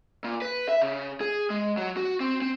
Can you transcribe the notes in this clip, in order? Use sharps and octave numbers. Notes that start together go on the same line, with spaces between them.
A#2
B4
E5
C#3
G#4
G#3
F#3
F#4
C4
C4